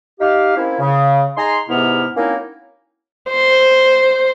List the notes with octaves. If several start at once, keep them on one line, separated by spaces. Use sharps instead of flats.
D#4 G4 F5
A#3 C4 C#4 E4
C#3
D#4 G#4 A#5 C6
E2 G#2 C3 B3 E4 F6
F#3 A#3 C4 C#4 D#4 E4
C5